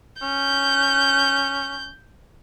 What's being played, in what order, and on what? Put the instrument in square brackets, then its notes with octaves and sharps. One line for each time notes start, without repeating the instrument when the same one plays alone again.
[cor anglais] C#4 [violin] G6